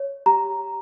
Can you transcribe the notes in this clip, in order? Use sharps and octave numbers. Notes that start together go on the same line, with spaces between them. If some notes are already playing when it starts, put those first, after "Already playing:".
Already playing: C#5
G4 A#5